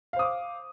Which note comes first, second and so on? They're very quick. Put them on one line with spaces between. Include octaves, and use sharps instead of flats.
F5 C5 D#6 D6